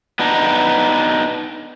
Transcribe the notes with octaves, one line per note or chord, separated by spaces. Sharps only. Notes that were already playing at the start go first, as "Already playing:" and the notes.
B3 D4 D#4